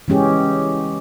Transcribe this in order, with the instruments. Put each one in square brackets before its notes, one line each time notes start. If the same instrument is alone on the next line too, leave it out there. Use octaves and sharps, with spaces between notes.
[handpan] E3 G#3 C#4 G4 G#4